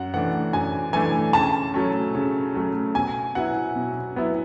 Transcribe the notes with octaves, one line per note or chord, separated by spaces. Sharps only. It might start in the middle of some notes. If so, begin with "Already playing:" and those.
Already playing: F#2 F#5
E3 A3 D4 F#5
F#2 G#5
E3 A3 D4 G#5
C#3 A5
F#3 A3 C#4
C#3
F#3 A3 C#4
B2 G#5
F#3 B3 E4 F#5
B2
F#3 B3 E4